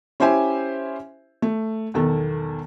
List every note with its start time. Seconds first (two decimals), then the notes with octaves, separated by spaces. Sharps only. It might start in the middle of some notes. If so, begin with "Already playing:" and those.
0.20 C#4 E4 G4 C5 E5 G#5
1.42 A3
1.94 B1 E2 D#3 A4